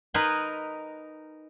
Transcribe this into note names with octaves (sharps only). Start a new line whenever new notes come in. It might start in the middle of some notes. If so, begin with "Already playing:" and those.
D#4 A#4 B4 G#5 B5 C6